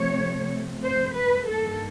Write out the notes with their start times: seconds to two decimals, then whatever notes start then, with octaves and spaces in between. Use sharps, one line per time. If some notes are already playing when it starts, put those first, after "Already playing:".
Already playing: C3 F3 A3 C4 C#5
0.83 C5
1.15 B4
1.48 G2 D#3 G3 A#3 A4